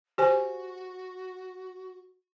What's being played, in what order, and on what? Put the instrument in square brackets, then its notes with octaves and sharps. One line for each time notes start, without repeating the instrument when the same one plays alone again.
[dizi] F#4 [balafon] G4 C5 G#5